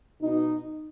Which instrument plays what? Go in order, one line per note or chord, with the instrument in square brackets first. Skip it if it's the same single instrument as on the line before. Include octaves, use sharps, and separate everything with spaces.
[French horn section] B2 D#4